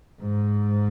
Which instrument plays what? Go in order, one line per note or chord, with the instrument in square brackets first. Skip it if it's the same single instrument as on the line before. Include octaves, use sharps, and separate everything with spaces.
[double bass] G#2